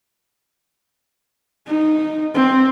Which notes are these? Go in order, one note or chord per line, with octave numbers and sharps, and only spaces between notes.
D#4
C4